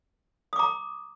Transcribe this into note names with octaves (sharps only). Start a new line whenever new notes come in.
A#5 D6 D#6